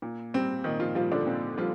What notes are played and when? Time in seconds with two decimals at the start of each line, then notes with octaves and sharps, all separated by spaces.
0.02 A#2
0.34 G3 C4
0.64 A#2 D#3 D#4
0.80 F3 F4
0.95 F3 G3 F4
1.12 D3 D4
1.26 A#2 C4
1.58 F3 G3 F4